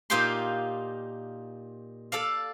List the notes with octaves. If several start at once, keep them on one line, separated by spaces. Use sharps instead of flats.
A#2 D#4 F4 G4 G5 C6
A4 D5 F5